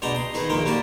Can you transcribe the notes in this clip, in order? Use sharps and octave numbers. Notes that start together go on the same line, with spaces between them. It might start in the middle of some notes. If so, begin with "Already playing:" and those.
B2 G#3 D4 G5 A#5
D#5 C6
D#3 D#4 G#4 B4
A#1 A#2 D#3 G#3 A#3 G5
G3 A#3 F#4 G4 A5